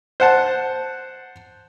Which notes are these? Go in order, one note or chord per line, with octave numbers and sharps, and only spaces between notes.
C5 F#5 A5